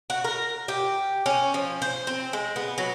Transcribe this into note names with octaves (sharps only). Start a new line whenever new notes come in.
F#4
A#4
G4
C#4
F3
C5
C4
G#3
B3
F#3